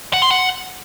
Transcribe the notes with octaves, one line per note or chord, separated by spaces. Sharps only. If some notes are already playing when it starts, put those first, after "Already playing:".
F#5
C6
F#5